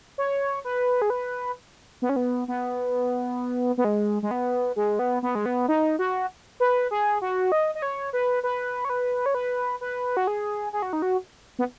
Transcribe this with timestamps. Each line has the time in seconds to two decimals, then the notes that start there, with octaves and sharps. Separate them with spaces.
0.18 C#5
0.65 B4
1.02 G#4
1.10 B4
2.02 B3
2.09 C#4
2.16 B3
2.48 B3
3.78 B3
3.84 G#3
4.23 G#3
4.31 B3
4.76 G#3
4.99 B3
5.23 B3
5.35 G#3
5.46 B3
5.68 D#4
5.99 F#4
6.60 B4
6.91 G#4
7.22 F#4
7.52 D#5
7.75 D#5
7.82 C#5
8.13 B4
8.43 B4
8.85 C#5
8.90 B4
9.26 C#5
9.35 B4
9.81 B4
10.17 F#4
10.27 G#4
10.73 G#4
10.82 F#4
10.93 D#4
11.02 F#4
11.59 B3